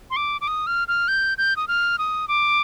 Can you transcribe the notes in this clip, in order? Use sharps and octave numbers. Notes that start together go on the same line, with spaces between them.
C6
D6
D6
D#6
F6
F6
G6
G6
D#6
F6
D#6
D6